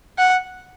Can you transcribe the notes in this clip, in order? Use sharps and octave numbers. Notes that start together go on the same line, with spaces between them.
F#5